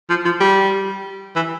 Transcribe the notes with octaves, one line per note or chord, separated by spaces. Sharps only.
F3
F3
G3
E3